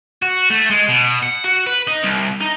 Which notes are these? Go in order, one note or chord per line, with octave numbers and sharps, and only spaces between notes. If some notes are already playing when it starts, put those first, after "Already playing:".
F#4
A3
G#3
B2
F#5
F#4
B4
D#4
C2
D#4